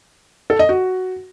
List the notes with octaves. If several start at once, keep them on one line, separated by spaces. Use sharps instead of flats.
A4
D#5
F#4